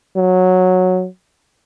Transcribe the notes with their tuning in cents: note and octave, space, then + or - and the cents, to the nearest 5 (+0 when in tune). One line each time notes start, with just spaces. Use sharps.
F#3 -10